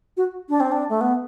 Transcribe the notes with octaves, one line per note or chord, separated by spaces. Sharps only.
F#4
D4
C4
D4
A3
B3